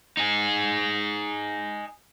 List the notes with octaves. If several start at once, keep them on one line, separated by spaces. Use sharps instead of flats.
D#4 G#4